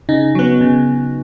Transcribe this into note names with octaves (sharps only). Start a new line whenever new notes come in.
C#3 D#4
F#3 B3
C#3